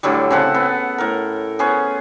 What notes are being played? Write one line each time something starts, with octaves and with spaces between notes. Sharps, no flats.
A2 D3 F#3 G3
C#3 C4 F#5 A5
B3
A2 A#4
B3 C#4 G#4 C5